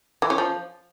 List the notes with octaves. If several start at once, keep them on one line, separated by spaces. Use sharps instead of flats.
E3
C#4
F3